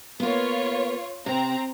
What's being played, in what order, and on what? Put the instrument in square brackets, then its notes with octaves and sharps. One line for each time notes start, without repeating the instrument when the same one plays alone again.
[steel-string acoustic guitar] A#3 B3 [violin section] F4 C#5
[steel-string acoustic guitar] C3 [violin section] C4 A#5